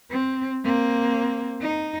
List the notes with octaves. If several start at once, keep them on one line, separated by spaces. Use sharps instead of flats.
C4
A#3 C4
D#4